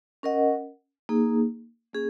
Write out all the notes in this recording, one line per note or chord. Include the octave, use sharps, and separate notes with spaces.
C#4 A#4 D#5 F#5
A#3 D#4 G#4
A#3 C#4 G#4